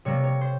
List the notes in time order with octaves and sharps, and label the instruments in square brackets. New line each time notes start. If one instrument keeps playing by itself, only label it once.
[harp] C3 G3 A#3 C#5
C#5
C5